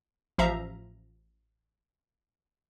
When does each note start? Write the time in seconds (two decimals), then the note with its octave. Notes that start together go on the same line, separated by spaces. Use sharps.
0.38 A1 F3 E5 F5 A#5